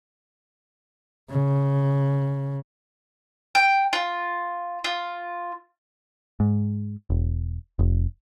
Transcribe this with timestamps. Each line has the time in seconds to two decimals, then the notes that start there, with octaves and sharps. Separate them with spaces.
1.31 C#3
3.55 G5
3.93 F4
4.84 F4
6.40 G#2
7.10 E1
7.79 F1